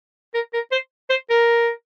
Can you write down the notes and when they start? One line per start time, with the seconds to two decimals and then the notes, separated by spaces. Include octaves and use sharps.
0.34 A#4
0.54 A#4
0.72 C5
1.10 C5
1.30 A#4